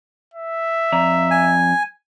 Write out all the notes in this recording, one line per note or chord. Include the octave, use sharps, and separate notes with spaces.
E5
F2 D5 A#5
G#5